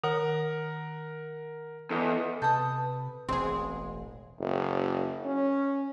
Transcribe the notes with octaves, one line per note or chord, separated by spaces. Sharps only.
D#3 A#4 F#5
E2 A4 D#5
C3 A4 B4 A5 D#6 G6
E1 A1 B2 G#3 C4 G#4 C6
F#1
C#4